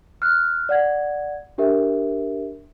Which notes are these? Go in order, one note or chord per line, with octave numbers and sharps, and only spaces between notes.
F6 F#6
D5 F#5 G#6
D4 G4 A#4 E5